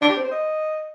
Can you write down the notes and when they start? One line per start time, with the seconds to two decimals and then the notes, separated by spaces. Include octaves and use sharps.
0.02 D4
0.09 G4
0.17 C4
0.24 C5
0.32 D#5